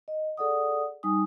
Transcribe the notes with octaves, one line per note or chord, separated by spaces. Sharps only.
D#5
G#4 A4 D5 F#5 D#6
G3 D#4 G#5 D#6